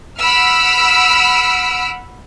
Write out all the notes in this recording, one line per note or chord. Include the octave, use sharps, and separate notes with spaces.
F#5 B5 E6 F6 B6 D7